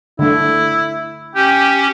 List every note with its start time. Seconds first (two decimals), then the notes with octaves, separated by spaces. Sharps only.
0.19 D3 A3 E4
1.35 C#4 G4 G5